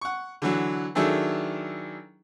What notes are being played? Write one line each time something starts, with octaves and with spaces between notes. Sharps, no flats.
F#5 C#6
D3 E3 F#3
D#3 F#3 D4 E4 G#4 A4